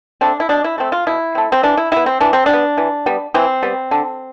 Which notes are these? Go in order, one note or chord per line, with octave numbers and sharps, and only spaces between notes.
A3 C4 D4
E4
B2 D4
E4
A3 C4
F4
B2 E4
A3 C4
C4
E3 D4
E4
G3 B3 E4
C4
E3 D4
C4
G3 D4
B3
E3
G3 B3
E3 C4
G3 B3
D3